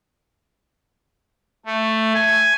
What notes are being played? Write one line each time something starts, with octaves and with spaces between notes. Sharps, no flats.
A3
G#5